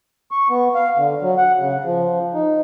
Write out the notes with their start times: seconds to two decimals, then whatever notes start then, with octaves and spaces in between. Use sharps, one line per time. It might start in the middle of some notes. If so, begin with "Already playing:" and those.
0.31 C#6
0.50 B3
0.75 F5
0.97 D3
1.22 F#3
1.38 F#5
1.59 C#3
1.85 F3
2.34 D#4